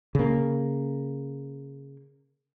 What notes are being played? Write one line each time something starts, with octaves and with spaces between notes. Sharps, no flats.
C#3 A#3